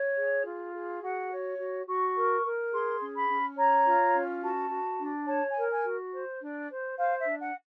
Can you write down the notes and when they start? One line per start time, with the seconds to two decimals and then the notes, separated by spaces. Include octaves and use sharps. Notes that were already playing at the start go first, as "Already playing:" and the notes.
Already playing: C#5
0.16 G#4
0.45 F4
0.73 G#4
1.02 F#4 F#5
1.30 C#5
1.58 F#4
1.87 F#4 C#6
2.15 A#4
2.43 A#4
2.72 G#4 C6
3.01 C#4
3.15 B5
3.28 C#4
3.57 C#5 A#5
3.86 F4
4.14 C#4
4.43 F#4 A5
4.70 F#4
4.99 D4
5.27 C#5 A5
5.49 G#5
5.56 A#4
5.69 G#5
5.84 F#4
6.13 C5
6.41 D4
6.70 C5
6.98 C5 F5
7.19 E5
7.26 D4
7.40 F#5